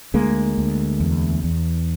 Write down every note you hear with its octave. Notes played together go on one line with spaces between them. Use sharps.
D2 G#3 A#3
D2
E2
E2